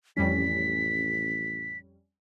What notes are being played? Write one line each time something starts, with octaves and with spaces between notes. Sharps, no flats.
A1 F2 G3 C#4 B6